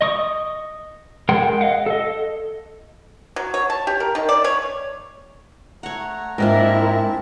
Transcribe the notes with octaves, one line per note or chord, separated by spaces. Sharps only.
D#5 C#6 D#6
G#3 A#4 F#5 G5 C6
D#5 F5 F#5
A4 D#5
F#3
C#5
A5
G4
A#4
D#3
D5
C#5
A3 C#5 F#5 A#5
G#2 A#3 C4 D4 E4 F4 A#4 A5